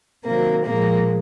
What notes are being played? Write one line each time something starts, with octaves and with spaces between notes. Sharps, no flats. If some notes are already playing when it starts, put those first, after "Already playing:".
C3 D#3 F#3 A#3
A#2 F3 G#3 A#3